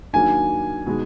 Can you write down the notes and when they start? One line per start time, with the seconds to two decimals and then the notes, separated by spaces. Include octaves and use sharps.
0.13 D#3 F#3 A#3 D4 G#5
0.86 B2 G#3 D#4